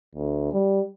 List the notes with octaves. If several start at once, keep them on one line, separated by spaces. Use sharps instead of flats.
D2
G3